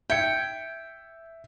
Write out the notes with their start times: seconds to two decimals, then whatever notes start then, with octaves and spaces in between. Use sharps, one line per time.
0.10 E5 G5 G#6 C#7